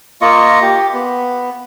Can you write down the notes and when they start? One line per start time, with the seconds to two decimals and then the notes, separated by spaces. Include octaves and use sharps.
0.21 A#3 F4 D#5 C#6
0.62 G4
0.93 B3